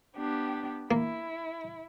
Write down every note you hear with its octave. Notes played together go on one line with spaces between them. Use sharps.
B3 D4 G4
A#3 E4